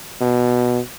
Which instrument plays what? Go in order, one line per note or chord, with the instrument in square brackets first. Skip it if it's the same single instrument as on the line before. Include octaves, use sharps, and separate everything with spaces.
[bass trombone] B2